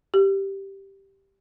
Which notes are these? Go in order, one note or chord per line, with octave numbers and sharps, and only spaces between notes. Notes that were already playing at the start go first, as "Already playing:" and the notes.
G4